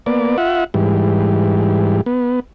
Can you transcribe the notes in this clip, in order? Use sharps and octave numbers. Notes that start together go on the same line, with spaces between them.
A#3 B3 D5
F4 E5 F#5
G#2 E3 G3
B3